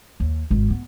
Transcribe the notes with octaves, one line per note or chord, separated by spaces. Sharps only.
D#2
G#1
B3